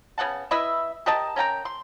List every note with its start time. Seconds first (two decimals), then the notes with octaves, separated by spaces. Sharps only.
0.18 C#3 B3 F#5 A5
0.51 E4 B4 D#5 E5
1.06 G4 A#4 D#5 A5
1.36 C#4 A#4 G5 A#5
1.65 C6